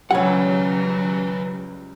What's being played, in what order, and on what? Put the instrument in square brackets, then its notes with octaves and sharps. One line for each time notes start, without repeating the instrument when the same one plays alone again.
[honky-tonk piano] C#2 G3 [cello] C#3 F#3 [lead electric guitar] B4 G#5 [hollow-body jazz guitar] C#5 F#5